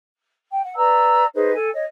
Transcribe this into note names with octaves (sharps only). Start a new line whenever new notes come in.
G5
F#5
B4 D5 A#5 E6
D#4 G#4 B4 C5
A4 G#5
C#5 D#5